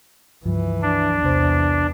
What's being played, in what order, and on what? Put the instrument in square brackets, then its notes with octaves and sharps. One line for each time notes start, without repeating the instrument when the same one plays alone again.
[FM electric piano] C#2 G2 F3 [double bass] E3
[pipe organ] D4
[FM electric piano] B1 C3 C5 [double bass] E2